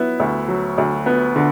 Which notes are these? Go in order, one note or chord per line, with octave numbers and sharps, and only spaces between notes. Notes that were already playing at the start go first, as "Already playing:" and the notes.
Already playing: F#3 B3 E4
D2
F#3
D2
B3
D3